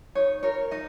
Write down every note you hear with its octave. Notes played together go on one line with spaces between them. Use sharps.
D#4 C#5
A#4 C#5
D#4 D#5